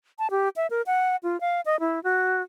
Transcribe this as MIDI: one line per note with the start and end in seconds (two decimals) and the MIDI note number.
0.19 0.27 81
0.31 0.49 67
0.56 0.67 76
0.70 0.82 70
0.87 1.16 78
1.23 1.40 65
1.41 1.61 77
1.66 1.80 75
1.80 2.03 64
2.04 2.43 66